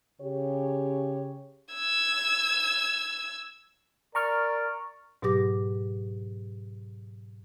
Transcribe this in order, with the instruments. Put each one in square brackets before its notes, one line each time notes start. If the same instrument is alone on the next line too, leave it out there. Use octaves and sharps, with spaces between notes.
[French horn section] C#3 G4 C#5
[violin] E6 G#6
[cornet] A#4 [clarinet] D5 [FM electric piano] A#5 C#6 F6
[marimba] G#2 B2 F#3 G4 D6 A#6